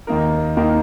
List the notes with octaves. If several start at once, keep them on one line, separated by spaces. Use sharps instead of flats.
D#2 D#3 A#3 D#4 A#4
D#2 D#3 A#3 D#4 A#4